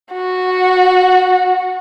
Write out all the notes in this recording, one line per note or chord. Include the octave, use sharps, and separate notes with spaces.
F#4